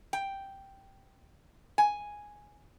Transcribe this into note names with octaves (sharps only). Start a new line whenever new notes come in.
G5
G#5